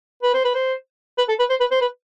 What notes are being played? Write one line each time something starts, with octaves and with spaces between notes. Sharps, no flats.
B4
C5
B4
C5
B4
A4
B4
C5
B4
C5
B4